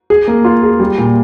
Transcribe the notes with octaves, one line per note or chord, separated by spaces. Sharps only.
G#4
A#3
F4
G#4
G3
A#2